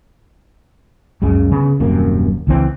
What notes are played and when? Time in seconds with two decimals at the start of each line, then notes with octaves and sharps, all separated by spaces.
1.22 C#2 F#2 C#3 G#3
1.52 C#3 B3
1.80 D#1 F#2 C3 A#3
2.47 C#2 E3 C4